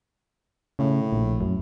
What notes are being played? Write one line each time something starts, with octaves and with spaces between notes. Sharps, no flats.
A2 C#3
A#1
F#2